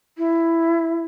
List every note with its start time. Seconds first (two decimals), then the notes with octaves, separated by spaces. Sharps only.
0.18 E4